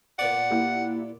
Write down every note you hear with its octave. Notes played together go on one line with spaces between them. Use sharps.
A#2 B3 D5 F#5
A#3 E4 G4